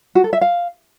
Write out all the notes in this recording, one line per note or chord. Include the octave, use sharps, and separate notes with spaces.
F#4
A4
E5
F5